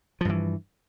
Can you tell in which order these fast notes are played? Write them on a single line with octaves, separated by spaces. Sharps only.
F3 G2 E3